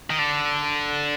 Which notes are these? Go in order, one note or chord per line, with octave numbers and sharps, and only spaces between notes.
D#3
D3